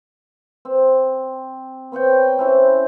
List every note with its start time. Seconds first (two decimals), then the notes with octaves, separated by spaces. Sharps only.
0.65 C4
1.92 B3 C4 C#5 G5
2.38 C4 C#4 E4 C5